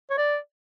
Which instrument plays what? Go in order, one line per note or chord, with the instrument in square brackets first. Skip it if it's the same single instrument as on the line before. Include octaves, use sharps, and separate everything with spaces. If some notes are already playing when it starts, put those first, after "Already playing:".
[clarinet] C#5
D5